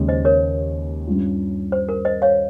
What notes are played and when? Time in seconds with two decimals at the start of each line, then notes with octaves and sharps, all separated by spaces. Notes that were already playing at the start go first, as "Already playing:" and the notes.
Already playing: D#2 C#3 G#3 C#4 G4
0.08 C5 D#5
0.25 A#4 C#5
1.07 G2 G3 C#4 F4
1.72 C5
1.89 A#4
2.05 C5 D#5
2.22 C#5 F5